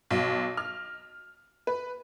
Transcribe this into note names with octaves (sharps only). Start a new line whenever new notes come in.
B1
F6
B4